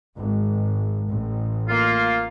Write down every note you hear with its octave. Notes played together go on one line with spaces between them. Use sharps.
G#1
A1
A#3 F4